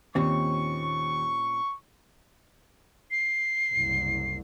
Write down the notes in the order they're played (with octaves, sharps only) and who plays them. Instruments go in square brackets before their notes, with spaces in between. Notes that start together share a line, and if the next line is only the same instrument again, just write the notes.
[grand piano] D#2 [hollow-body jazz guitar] A#2 C4 C#4 [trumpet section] C#6
[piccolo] C7
[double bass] F#1 C2